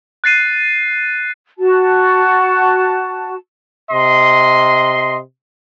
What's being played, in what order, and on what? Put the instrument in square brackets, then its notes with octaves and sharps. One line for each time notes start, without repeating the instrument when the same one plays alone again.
[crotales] F#6 A6 C7 D#7
[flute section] F#4 A5
[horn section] C3 D#5 C6